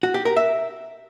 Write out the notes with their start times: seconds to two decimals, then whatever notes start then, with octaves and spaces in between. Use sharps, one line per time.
0.03 F#4
0.14 G4
0.25 A#4
0.36 E5